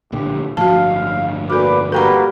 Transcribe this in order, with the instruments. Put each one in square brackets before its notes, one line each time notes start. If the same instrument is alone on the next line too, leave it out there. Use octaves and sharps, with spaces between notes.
[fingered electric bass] A#1 A2 D3 [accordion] G4
[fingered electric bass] G1 A2 F3 [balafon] F#4 A5 [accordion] F5
[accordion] A#2 B4 D6 [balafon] F#4 A4
[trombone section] G3 A#3 [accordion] F#4 B4 [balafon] A4 G5 A#5